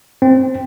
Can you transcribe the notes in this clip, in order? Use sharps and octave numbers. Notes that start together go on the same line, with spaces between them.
C4